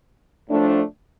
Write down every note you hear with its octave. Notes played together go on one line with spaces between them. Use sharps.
A2 F3 A3 D4